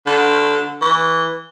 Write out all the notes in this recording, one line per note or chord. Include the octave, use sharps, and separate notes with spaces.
D3
E3